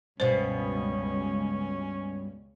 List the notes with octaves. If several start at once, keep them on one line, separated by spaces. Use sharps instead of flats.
C#2 G2 B2 C#4 B4 C5